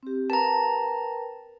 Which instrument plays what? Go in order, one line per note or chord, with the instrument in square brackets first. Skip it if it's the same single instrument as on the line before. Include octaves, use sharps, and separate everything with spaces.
[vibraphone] C4 G4
[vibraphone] A#4 B4 G5 [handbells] A5 A#5